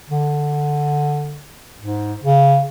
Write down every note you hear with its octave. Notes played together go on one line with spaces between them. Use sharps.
D3
G#2
C#3